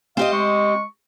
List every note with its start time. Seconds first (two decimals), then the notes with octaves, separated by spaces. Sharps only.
0.17 C4 G4 D#5 F5
0.32 G#3 C#6